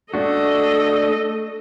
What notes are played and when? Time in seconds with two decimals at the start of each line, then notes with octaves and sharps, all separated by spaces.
0.14 A3 D4 F#4 A4 D#5